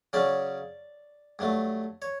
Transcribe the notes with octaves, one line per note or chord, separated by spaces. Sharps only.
C#3 F#3 C#4 D5
G2 F#3 A3
C#5